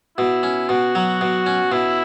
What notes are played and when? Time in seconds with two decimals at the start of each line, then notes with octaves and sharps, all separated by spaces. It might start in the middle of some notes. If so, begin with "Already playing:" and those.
0.17 B2 E4
0.43 C#4
0.69 B2 F#4
0.95 F#3
1.21 B2
1.46 C#4
1.72 B2 E4